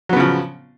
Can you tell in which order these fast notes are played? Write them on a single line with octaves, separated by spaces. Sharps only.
F#3 B3 C#3 F3